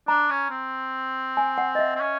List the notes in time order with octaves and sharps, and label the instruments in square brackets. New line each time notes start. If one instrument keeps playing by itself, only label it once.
[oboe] D4 [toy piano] A#5
[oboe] C#4
C4
[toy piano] G#5
F#5
D#5
E5
[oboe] C4
C#4